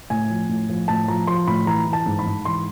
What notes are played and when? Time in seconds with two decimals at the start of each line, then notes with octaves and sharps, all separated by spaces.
0.10 A2 G#5
0.30 F3
0.49 A2
0.69 F3
0.88 A2 A5
1.08 F3 A#5
1.27 F3 C6
1.47 A2 B5
1.66 E3 A#5
1.87 E3
1.93 A5
2.06 G#2
2.19 B5
2.26 G#2
2.45 E3 C6